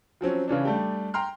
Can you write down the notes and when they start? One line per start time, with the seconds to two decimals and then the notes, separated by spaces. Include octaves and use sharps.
0.21 F3 F#3 C4 C#4
0.48 C#3 E3 C#4 D4
0.65 G3 A3 D4 G4
1.14 G5 A#5 C6 F6